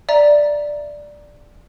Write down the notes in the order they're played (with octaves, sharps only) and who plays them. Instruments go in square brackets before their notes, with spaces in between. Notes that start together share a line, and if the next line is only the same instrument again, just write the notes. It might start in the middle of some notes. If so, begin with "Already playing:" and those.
[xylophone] D5 E5 A#5